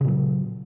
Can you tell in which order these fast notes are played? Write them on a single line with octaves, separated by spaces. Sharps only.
C#3 A#2 F#3